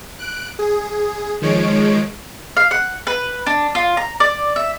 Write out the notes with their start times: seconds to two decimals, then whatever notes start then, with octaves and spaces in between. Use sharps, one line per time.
0.19 F#6 D7
0.59 G#4
1.42 D#3 F3 G#3 C#5 D7
2.57 F5
2.71 F#5
3.07 B4
3.46 D4
3.75 F4
3.97 A#5
4.20 D5
4.56 E5